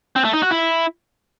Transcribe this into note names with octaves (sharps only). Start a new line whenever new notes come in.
C4
A3
D#4
F#4
E4